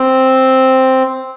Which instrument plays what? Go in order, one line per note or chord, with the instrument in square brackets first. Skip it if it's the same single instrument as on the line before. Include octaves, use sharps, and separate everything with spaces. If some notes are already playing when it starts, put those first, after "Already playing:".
Already playing: [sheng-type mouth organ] C4